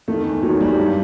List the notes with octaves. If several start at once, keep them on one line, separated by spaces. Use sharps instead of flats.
D#3 A3
E2
D#3 F#3
E2 G3
G2